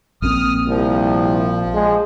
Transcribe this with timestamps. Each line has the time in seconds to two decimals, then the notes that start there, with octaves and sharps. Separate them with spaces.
0.22 A#1 A#2 C4 D#6 F6
0.66 C2 F3
1.73 G#3